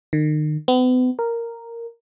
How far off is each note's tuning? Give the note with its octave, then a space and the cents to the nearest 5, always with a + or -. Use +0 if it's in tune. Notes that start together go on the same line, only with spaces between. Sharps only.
D#3 -35
B3 +40
A#4 -5